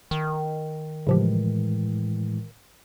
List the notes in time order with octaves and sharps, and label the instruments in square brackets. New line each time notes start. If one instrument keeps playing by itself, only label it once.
[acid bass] D#3
[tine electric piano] A2 E3 G#3 [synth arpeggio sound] C#3 F3 G4